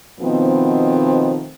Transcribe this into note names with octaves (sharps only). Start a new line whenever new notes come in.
B2 D#3 F3 A3 B3 C4